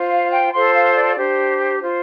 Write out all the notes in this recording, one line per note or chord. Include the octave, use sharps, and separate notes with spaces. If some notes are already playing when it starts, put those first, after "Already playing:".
Already playing: F4 C5
F5
G5
F4 A4 C5 C6
F5
D5
D4 G4 C5
F4 C5